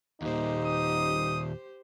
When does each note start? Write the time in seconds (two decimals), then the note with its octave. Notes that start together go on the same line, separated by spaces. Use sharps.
0.22 D#2 A#2 D#4 G4 C5
0.64 D#6